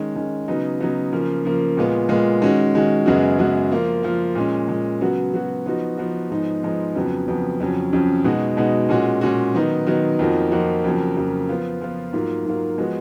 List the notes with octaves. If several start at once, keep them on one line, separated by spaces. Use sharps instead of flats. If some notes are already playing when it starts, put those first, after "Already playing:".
Already playing: D#3 G#3 C#4
D#3 G#3 C#4
C#3 F#3 B3 D#4
C#3 F#3 B3 D#4
C#3 F3 A#3
C#3 F3 A#3
A#2 G#3 B3 F4
A#2 G#3 B3 F4
D#3 G#3 C#4 F#4
D#3 G#3 C#4 F#4
F#2 C#3 G#3 B3 F#4
F#2 C#3 G#3 B3 F#4
F3 A#3 F4
F3 A#3 F4
A#2 G#3 C#4
A#2 G#3 C#4
C#3 F#3 B3 F#4
C#3 F#3 B3 F#4
F3 B3 D#4 F#4
F3 B3 D#4 F#4
G#2 F3 G#3 B3 D#4
G#2 F3 G#3 B3 D#4
F2 C#3 F#3 B3
F2 C#3 F#3 B3
F2 C#3 F#3 C#4
F2 C#3 F#3 C#4
B2 G#3 D#4 F#4
B2 G#3 D#4 F#4
A#2 G#3 C#4 F#4
A#2 G#3 C#4 F#4
D#3 F#3 B3 D#4
D#3 F#3 B3 D#4
F2 F3 A#3 D#4 F#4
F2 F3 A#3 D#4 F#4
F2 C#3 F#3 A#3
F2 C#3 F#3 A#3
F3 B3 F4
F3 B3 F4
G#2 F#3 A#3 F4
G#2 F#3 A#3 F4
F3 G#3 B3 F#4